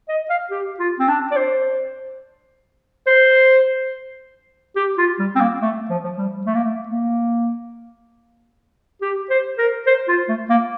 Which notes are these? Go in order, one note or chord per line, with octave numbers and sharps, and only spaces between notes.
D#5
F5
G4
F4
C4
D4
D5
C5
C5
G4
F4
G3
C4
A#3
A3
F3
F3
G3
A3
A#3
A3
A#3
G4
C5
A#4
C5
F4
A3
A#3